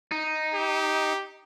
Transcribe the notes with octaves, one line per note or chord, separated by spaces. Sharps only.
D#4
G4